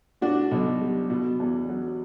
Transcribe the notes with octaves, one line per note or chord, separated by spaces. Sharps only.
A2 D4 F#4
B1
G3
B2
E2
F#3